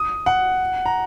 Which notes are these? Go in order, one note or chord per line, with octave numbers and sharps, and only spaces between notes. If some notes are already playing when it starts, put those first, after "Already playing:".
Already playing: D#6
F#5
A#5